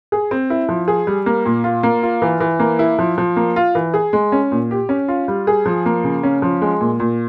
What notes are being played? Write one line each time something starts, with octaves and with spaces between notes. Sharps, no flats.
G#4
C4
E4
F3
G#4
G3
A#3
A#2
F4
A#3
F4
E3
E3
A#3
E4
F3
F3
A#3
F4
E3
G#4
G#3
C#4
A#2
G4
C#4
F4
G3
G#4
F3
A#3
C#3
C#4
F3
G#3
A#2
A#2